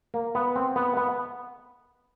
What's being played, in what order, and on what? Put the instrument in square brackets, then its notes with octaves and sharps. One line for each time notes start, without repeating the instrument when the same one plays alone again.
[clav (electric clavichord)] A#3
B3
C4
B3
B3